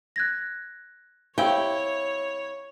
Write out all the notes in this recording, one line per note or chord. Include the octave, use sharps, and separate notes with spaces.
F#6 G#6 A#6
C3 E4 G4 C#5 F5 G5